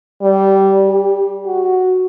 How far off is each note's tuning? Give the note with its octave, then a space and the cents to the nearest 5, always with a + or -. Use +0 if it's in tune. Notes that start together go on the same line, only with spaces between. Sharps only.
G3 -15
G4 +20
F#4 +0